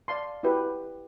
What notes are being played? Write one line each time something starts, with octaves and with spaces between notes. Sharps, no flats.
D5 F5 A5 C6
E4 F#4 G4 B4